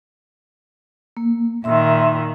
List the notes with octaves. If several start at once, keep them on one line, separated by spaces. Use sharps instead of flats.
A#3
A#2 D#3 E5 C6 E6